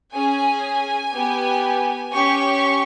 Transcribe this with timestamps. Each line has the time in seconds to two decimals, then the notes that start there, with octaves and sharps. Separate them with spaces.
0.13 C#4 G#4 G#5
1.14 B3 G4
2.13 C#4 G4 C#6